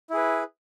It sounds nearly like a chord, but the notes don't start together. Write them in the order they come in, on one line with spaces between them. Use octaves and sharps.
E4 G#4 B4